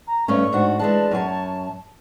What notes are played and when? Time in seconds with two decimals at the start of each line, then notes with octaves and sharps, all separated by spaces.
0.08 A#5
0.28 G2 A3 C#4 C#6
0.53 G#2 D4 F#4
0.79 E3 G#3 D4 A5
1.11 F#2 C#5 G#5